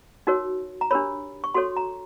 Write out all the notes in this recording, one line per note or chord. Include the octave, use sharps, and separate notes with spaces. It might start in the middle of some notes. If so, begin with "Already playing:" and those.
D#4 F#4 A#4 C#5
A#5
D4 G4 A#4 C#5 B5
C#6
F#4 A4 C#5 C6
A#5